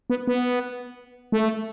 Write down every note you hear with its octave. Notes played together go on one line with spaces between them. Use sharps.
B3
B3
A3